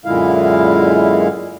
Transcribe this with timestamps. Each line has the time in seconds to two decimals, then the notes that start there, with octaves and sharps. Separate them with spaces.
0.05 F#2 A#2 D3 G#3 E4 F5